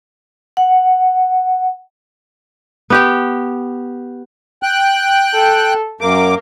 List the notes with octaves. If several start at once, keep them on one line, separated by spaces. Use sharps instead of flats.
F#5
B3 G4 G5
G5 F#6
A4
F#2 A#3 D6